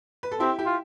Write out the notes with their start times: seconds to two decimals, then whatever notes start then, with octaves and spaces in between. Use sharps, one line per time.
0.23 B4
0.32 A4
0.40 C4 E4 G4
0.59 E4 G4
0.66 F4